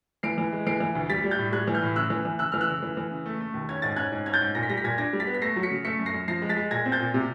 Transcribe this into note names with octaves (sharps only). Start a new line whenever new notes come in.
E3 C7 D7
E3
G#3
E3 C7 D7
E3
D2
G3 A6 B6
G3
G6 A6
A2
G3 F#6 G#6
E3
F6 G6
A2
C#3 E6 F#6
E3
E3
C#3 E6 F#6
E3 F6
E6 F#6
C#3
E3
E3
C#3
A3
A3
D#2
C#4 G#6
G#2 A6
C#4 F#6 G#6
G#2
C#4 G#6
G6 A6
G#2
A#2 A#6
B6
G3 A#6
B6
A#2 G#6 A#6
D4 G#6 A#6
G3
A6 B6
B3
B6
A3 A#6 C7
F#3
B6 C#7
C#3
A3 B6 C#7
F#2
A#6 C7
F#2
F3 A#6 C7
G#3
A6 B6
G#3
A#2 G#6 A#6
C4
G6 A6
A#2
C3